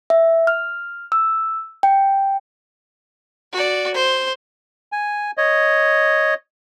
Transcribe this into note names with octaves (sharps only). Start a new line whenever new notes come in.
E5
F6
E6
G5
F#4 D5
C5
G#5
C#5 D#5